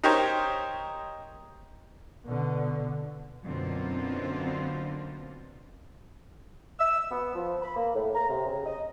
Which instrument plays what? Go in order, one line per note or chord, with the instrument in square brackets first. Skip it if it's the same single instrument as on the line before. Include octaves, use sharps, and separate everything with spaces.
[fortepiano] D#4 G4 A#4 C5 C#5
[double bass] B2 D3
[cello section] F#2 B2 D3 A#3 C4 F4
[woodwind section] E6
B3
F3
B5
A#3
A2
A#5
C3
C#3
D#5